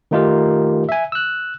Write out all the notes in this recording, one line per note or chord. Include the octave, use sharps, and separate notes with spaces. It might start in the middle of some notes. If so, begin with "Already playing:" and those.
D#3 A3 D#4 F4 G4 A#4
E5 G#5
E6 F#6